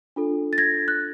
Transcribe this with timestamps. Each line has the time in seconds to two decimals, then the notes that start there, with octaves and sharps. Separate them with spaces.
0.16 D4 F4 A4
0.53 A6
0.58 G#6 A#6
0.88 F#6